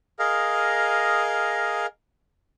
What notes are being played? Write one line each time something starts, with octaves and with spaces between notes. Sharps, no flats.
G#4 A#4 D#5 F5